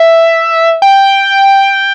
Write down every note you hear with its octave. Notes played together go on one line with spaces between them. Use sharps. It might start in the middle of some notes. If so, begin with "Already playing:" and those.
Already playing: E5
G5